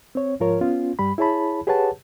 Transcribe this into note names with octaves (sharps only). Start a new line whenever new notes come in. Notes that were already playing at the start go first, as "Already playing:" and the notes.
C4 C#5
G#2 F3 F4 A#4 C#5
B3 C#4 F4
G2 G3 B5
E4 G#4 C#5 A5 B5
G4 G#4 B4 C#5 F#5 A5